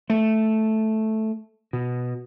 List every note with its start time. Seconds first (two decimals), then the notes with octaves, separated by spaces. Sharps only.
0.10 A3
1.73 B2